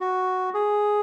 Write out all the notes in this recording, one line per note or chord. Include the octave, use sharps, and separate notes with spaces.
F#4
G#4